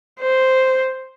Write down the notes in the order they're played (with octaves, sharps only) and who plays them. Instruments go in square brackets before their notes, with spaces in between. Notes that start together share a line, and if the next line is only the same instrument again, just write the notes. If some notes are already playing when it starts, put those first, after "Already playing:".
[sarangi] C5